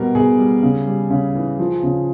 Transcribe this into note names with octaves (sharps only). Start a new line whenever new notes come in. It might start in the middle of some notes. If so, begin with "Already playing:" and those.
Already playing: B2 G3 A#4
B2 G#4
G3
C#3
G3
C#3
E3
F3
C#3